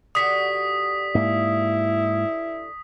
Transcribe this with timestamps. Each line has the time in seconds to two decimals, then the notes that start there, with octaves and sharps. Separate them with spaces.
0.15 D3 F#4 G4 D#6 B6
1.15 G#2 A#3 E4